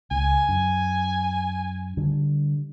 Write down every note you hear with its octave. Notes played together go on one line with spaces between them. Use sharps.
C#2 G#5
F#2
D3 G3